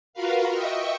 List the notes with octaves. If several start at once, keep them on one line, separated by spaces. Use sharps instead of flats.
F4 F#4 A#4 B4 F5
D#5 E5 G5 C#6